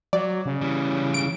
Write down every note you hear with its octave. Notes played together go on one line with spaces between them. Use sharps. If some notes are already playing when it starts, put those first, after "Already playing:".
F#3 D5
C#3
E3 G3
D7